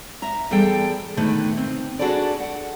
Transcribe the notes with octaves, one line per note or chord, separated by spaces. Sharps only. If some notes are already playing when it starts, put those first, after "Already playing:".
E5 A#5
E2 G3 G#4 A4 G5
B2 D3 D#3 A3 B4
C4
D4 F#4 G#4 A4 B4 D5
F#5